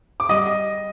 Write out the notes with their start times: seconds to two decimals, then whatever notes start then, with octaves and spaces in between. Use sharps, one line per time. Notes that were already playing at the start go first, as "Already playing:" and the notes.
0.20 D6
0.29 G3 D#5 D#6